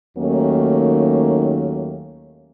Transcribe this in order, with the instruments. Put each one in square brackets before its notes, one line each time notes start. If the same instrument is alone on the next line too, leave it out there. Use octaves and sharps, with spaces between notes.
[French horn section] D#2 D#3 F#3 A3 A#3 C#4